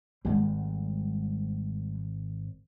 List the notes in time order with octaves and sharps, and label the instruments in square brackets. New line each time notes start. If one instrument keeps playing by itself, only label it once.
[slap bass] G#1 [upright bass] G3 G#3